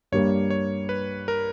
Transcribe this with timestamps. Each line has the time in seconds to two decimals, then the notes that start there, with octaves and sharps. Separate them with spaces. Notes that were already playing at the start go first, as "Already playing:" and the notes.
0.12 G2 G3 A#3 C#5
0.50 C#5
0.89 B4
1.28 A#4